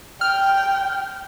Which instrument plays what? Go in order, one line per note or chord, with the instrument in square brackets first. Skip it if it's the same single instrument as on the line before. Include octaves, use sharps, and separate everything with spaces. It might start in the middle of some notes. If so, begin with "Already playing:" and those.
[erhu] G5 [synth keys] F6